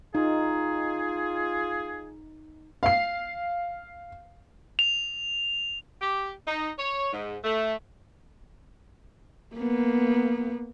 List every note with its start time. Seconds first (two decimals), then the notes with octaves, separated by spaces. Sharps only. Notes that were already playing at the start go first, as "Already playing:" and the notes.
0.15 D#4 F4 G#4
2.83 F5 C7
4.79 F7
6.02 G4
6.47 D#4
6.79 C#5
7.13 G#2
7.44 A3
9.56 A#3 B3